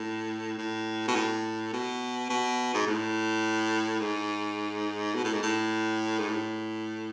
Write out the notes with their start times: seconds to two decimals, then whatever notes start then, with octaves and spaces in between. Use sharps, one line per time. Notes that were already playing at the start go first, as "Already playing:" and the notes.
Already playing: A2
0.58 A2
1.08 B2
1.15 A2
1.73 B2
2.30 B2
2.74 G#2
2.87 A2
4.00 G#2
5.15 B2
5.24 A2
5.34 G#2
5.43 A2
6.19 G#2
6.29 A2